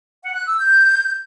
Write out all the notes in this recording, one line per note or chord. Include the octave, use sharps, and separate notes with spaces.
F#5
F#6
E6
G6